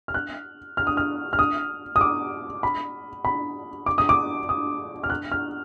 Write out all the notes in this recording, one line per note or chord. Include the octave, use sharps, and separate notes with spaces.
F6
F#6
F6
D#6
F6
F6
D#6
D#6
D6
B5
B5
D6
D#6
D6
D#6
F6
F#6
F6